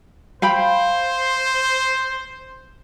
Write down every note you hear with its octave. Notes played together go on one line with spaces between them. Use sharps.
C5 F5 G5 B5